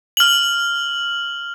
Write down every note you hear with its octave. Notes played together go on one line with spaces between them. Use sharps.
F6 F#7